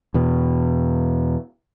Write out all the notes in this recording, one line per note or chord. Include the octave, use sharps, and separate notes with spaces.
E2 B2